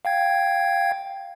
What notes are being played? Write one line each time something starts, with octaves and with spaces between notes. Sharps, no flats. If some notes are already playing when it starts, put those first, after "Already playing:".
F5 G5 G#6